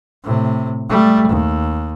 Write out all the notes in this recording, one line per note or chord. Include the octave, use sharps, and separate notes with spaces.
A2 C3
G3 A3
D#2